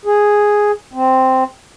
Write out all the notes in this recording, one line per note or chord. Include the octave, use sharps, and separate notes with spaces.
G#4
C4